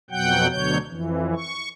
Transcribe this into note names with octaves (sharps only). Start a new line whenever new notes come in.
F2 B2 F#3 F#5 G5 G6
D2 B2 D3 F#3 C#5 G6
F2 E3
C#6